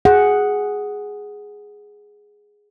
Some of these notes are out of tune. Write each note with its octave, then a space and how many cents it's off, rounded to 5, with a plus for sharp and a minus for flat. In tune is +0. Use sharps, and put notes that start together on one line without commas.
G#4 +0 F#5 +0